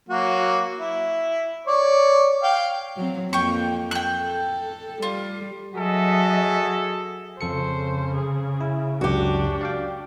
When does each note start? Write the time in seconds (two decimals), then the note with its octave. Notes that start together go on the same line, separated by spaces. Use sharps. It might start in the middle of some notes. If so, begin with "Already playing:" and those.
0.09 F#3 A#3 F#4
0.79 E4
1.67 C#5 D5
2.43 F5 G5
2.97 F#3 C4
3.33 F2 A#3 G5 C#6
3.91 G5 F#6
4.23 A4
5.02 G3 F4
5.74 F#3 F#4 G#4 A4 D#5 E5
7.41 F2 C#3 A4 C5 C#7
8.15 G#4
8.61 E4
9.01 C#2 F#2 D4 F#4 G4
9.61 D5 F5 G5